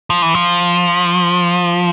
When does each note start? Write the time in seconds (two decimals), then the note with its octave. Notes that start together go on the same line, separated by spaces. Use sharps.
0.10 F3
0.22 E3
0.34 F3